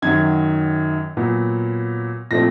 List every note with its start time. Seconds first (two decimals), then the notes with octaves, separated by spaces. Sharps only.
0.02 F#2 D#3 F#3 G#6
1.17 A#2 F#3 B3
2.31 A#2 F3 A3 C4 A#6